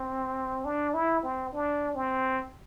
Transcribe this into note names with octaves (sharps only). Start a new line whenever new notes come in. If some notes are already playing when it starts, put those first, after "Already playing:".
Already playing: C4
D4
E4
C4
D4
C4